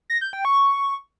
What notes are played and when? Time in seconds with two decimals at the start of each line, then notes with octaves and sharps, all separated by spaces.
0.10 A#6
0.21 G6
0.33 G5
0.45 C#6